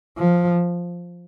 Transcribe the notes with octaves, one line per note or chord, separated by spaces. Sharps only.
F3